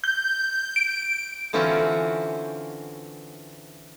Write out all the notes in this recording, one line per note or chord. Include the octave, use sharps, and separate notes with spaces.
G6
D7
D3 E3 C4 C#4 F4 F#4